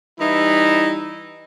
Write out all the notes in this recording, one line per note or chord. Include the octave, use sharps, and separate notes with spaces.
E3 G3 D#4 E4